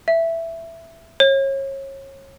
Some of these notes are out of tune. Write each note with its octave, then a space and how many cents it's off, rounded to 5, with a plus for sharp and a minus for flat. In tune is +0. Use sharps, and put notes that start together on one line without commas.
E5 +10
C#5 -30